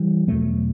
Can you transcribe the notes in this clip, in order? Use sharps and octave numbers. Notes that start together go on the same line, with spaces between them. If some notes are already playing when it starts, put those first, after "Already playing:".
Already playing: E3 G3
E2 B2 F#3 A3